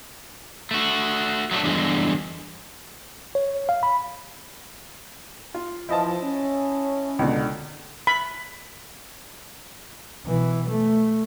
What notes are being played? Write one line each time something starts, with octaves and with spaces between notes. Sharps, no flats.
A3 F#4
F#3 A3 D4
E2 G2 D3 G#3
C#5
F5
B5
F4
E3 F3 E4 D#5 A5
C#4
C#2 B2 D3
B5
B2 E3
A3